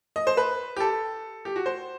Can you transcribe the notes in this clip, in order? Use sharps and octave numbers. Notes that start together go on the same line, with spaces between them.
D#5
C5
B4
G4
A4
G4
F#4
C5